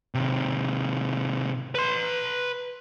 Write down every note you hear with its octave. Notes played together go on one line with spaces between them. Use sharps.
C3 D#3
B4 C6